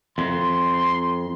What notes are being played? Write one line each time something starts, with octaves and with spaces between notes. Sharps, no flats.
F2 C6